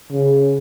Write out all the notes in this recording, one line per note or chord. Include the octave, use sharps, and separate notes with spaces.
C#3